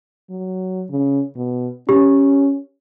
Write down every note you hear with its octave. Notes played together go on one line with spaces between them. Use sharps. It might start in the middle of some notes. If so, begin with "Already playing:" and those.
F#3
C#3
B2
C#4 G4